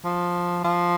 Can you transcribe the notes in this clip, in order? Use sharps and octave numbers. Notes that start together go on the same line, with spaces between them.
F3
F3